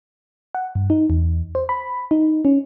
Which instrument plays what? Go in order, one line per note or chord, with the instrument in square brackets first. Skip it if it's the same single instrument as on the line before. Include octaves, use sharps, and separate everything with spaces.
[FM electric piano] F#5
G2
D#4
E2
C5
B5
D#4
C#4